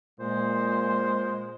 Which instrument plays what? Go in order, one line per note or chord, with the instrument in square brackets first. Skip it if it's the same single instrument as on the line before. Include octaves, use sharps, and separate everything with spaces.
[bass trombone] A#2 [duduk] G#3 [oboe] C5